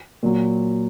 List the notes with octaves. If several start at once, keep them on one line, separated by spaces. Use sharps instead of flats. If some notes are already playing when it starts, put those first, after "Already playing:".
A#2 F#3